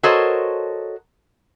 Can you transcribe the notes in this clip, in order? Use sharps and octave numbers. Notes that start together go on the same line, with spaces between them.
F#4 A4 A#4 C5 C#5 D#5